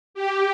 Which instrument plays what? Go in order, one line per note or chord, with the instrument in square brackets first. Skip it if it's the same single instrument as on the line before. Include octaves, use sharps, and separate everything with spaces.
[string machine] G4